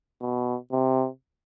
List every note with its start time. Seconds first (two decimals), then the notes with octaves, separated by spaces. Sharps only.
0.21 B2
0.72 C3